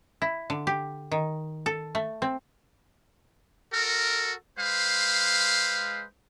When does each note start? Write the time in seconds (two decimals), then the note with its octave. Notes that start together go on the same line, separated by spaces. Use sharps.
0.22 E4
0.50 D3
0.67 G4
1.11 D#3
1.66 A4
1.95 A3
2.22 C4
3.73 F#4 A4 A#4
4.59 G#3 B4 C5 F5